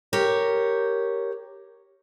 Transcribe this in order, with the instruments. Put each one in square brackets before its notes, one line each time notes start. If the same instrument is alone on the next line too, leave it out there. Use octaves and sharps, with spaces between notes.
[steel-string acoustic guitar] G4 A#4 C#5